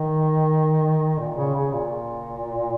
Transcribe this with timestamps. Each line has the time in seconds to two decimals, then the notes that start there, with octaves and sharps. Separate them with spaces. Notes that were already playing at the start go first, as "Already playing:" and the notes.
Already playing: D#3
1.19 A#2
1.37 C#3
1.55 C#3
1.73 A#2